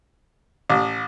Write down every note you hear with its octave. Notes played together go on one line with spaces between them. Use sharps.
A1